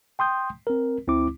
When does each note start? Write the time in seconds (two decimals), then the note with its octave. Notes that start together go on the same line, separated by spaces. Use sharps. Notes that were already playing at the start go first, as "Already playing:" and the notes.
0.19 G5 C6 D#6 G6
0.67 C4 A#4
1.07 D2 C4 E4 D6